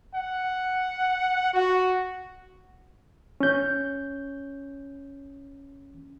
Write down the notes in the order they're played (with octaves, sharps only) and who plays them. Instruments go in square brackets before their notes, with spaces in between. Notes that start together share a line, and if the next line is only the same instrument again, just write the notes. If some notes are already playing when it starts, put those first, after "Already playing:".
[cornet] F#5
F#4
[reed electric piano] C#4 G6